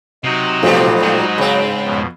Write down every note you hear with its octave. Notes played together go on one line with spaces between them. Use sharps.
C3 F#3 D#4
A#2 F3 G3 A3 F4 C5
G#2
C#3 C4 B5
F2 B2